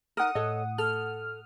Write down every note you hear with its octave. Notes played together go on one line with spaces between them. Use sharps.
D#4 A#4 F#5 D#6
A2 A4 C#5 D#5
A4 F6